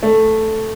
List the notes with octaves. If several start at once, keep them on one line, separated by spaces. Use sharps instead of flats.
A3